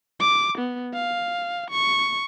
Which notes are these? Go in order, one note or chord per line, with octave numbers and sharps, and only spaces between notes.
D6
B3
F5
C#6